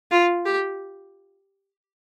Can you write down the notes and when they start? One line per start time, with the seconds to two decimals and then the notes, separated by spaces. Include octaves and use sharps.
0.11 F4
0.46 G4